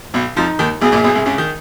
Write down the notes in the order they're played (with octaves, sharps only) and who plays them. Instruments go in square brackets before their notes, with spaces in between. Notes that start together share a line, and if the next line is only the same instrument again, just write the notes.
[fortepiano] B1 B2
[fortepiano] F2 F3 [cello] D#4
[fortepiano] D#2 D#3
[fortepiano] B1 B2 [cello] G#4
[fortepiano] A#1 A#2
B1 B2
C2 C3
C#2 C#3
D#3